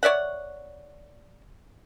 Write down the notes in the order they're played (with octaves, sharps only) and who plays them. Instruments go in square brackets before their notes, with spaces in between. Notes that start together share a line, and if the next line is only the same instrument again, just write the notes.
[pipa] C#5 D5 E5 F#5